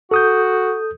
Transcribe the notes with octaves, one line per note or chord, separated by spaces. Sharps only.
F#4 A4 D#6 G6